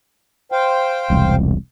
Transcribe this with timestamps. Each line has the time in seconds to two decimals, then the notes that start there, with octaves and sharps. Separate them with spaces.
0.52 C5 F5 G5
1.10 E1 C2